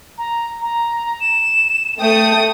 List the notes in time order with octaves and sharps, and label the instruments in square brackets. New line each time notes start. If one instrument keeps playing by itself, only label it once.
[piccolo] A#5
A#5
E7
[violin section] A3 D#6 [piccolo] G5